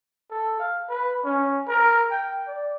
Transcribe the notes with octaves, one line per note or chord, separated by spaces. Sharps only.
A4
F5
B4
C#4
A#4
G5
D5